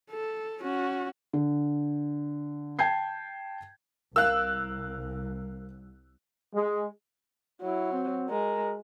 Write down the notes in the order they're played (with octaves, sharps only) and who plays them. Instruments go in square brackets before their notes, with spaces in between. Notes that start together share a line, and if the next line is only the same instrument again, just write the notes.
[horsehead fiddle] A4
C#4 F#4
[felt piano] D3
G5 A5 G6 G#6 C7
[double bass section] C2 [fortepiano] A#4 F5 [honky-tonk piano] E6 F#6
[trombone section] G#3
[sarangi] F#3 [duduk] E4
[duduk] C4
[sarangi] G#3 [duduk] A#4